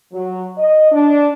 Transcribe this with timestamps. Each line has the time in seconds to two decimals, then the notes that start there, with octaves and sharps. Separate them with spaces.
0.13 F#3
0.57 D#5
0.91 D4